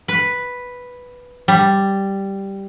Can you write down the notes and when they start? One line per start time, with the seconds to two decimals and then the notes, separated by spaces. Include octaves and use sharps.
0.08 B4
1.48 G3